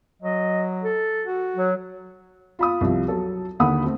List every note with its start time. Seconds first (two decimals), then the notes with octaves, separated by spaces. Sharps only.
0.22 F#3 D#5
0.83 A4
1.26 F#4
1.56 F#3
2.59 F4 B5 D#6
2.81 C2 F3
3.08 F#3 A4
3.59 D#2 D3 F#5 B5 D#6
3.83 A3 C4